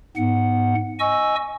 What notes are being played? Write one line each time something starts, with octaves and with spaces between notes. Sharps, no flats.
G#2 B3 F#5
D#5 G#5 C#6 E6